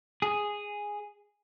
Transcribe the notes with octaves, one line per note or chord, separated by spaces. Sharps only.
G#4